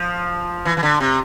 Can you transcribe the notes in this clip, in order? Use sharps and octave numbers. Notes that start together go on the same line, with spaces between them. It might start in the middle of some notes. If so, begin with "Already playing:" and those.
Already playing: F3
E3
E3
D3
C3